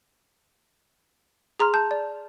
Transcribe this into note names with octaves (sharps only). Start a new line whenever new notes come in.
G#4 A#5 C6 F6
A5 G6
D5